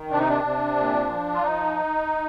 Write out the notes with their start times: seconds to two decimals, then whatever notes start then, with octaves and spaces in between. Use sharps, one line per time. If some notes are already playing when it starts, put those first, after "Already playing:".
Already playing: D#3
0.10 C3 D4
0.20 D#4
0.28 D4
0.44 C3
0.77 A#2
1.10 F3
1.34 F4
1.43 F3 D#4